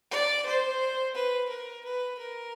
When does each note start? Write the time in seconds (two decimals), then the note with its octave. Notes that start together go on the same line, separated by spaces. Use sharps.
0.11 D5
0.45 C5
1.14 B4
1.49 A#4
1.84 B4
2.18 A#4